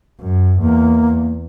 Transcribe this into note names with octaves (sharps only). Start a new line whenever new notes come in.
F#2
E2 A#3